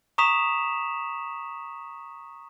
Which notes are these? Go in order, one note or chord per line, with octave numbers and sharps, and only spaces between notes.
A#5 C#6 D#6 B6 E7 F7